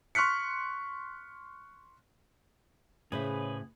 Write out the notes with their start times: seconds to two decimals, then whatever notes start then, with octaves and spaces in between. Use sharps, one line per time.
0.15 C6 C#6 F6 F#6 B6 C#7
3.12 A2 C#3 G#4 B4 C5 E5